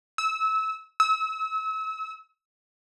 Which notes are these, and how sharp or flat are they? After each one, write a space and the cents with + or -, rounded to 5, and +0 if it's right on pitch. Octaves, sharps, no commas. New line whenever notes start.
E6 -25
E6 -35